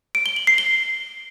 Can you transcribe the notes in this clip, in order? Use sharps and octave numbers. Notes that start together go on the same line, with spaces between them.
D7
G7
F#7
C7
G7